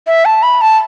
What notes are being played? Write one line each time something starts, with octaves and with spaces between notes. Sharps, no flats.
E5
A5
B5
A5